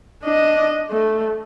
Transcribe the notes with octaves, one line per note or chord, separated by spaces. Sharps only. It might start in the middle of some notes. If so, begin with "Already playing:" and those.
D4 D#5
A3